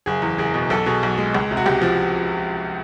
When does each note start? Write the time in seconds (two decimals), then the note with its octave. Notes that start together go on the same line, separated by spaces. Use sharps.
0.06 F#1 G#4
0.22 E2
0.38 F#1 G#4
0.54 B2
0.70 B1 A4
0.86 B2 G#4
1.03 B1
1.18 G#3
1.35 C#2
1.51 C3
1.57 F#4
1.66 C#2 G4
1.82 F3